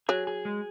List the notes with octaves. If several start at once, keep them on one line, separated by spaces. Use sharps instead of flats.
F#3 G#4
G#4
G#3